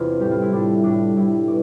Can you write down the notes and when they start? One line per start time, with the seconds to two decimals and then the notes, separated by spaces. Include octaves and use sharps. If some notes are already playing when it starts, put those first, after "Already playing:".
Already playing: E2 C3 D4 F4
0.20 A2 G3 G4
0.31 F4
0.42 E4
0.53 A2 G3 D4
0.84 A2 G3 D4
1.16 A2 G3 E4
1.47 B2 D5